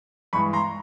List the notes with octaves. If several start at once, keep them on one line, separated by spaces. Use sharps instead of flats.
G2 E3 G#3 B5 C#6
A#5 C6